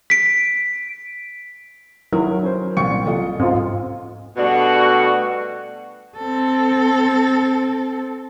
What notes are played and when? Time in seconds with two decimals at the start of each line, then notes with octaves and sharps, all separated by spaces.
0.10 B6 D7
2.13 D#3 F#3 E4 A#4
2.43 C#4 C5
2.77 C2 A#2 G5 C#6 C#7
3.06 C2 F4 A4 D#5
3.39 G#2 C4 F4
4.37 B2 G3 A3 D4 F#4
6.18 C4 A4